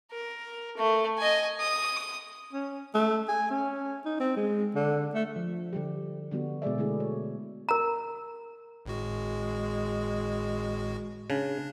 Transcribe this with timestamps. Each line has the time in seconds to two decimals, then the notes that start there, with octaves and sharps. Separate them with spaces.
0.11 A#4
0.77 A3
1.18 D#5 G#5
1.60 D#6
2.53 C#4
2.94 A3
3.28 G#5
3.50 C#4
4.05 D#4
4.20 C4
4.36 G#3
4.75 D3
5.14 A3
5.36 F3
5.73 D3 G3 G4
6.31 D3 G3 B3 F#4
6.62 B2 G#3 G#4 D5 E5
6.78 D3 G#3 A3 E4 G#4
7.00 C#5
7.69 A#4 A#5
8.86 G#1 A2 G#3 F#4
11.30 C#3 D4